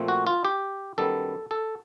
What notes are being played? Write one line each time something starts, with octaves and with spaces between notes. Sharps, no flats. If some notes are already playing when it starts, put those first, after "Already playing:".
Already playing: A#2 F3 A3 C4
F#4
F4
G4
F#2 D#3 G3 B3 A4
A4